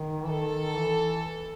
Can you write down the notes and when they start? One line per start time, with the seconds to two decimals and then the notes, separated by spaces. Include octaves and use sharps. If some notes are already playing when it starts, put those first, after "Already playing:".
Already playing: D#3
0.22 E3
0.29 D#3 A4
0.75 E3